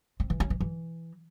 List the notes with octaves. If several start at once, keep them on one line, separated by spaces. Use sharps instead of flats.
C4
E3
C#4
E3
E3